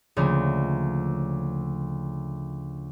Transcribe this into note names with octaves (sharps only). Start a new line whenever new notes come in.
D2 C#3 F3 A3 A#3